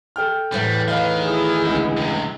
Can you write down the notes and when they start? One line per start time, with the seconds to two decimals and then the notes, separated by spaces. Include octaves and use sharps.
0.16 A4 G5 F6
0.52 E2 A2 E3 G3
0.88 D#3 B4 D#5 F5
1.22 E4 G#4
1.66 C#2 D3
1.97 G2 C3